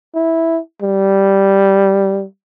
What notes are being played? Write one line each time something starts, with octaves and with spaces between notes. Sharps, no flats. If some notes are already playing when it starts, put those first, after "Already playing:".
E4
G3